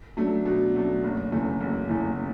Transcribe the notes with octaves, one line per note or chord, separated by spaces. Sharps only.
F#3 A3 D4
B2
F#3 A3 D4
F#1
E2 C#3 E3 A3
F#1
E2 C#3 E3 A3